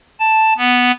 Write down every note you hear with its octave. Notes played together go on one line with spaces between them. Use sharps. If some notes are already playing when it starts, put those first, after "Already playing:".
A5
B3